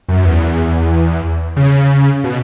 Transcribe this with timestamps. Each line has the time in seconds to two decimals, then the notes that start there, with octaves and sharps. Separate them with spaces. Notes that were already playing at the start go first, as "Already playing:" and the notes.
0.09 F#2
0.25 E2
1.57 C#3
2.24 B2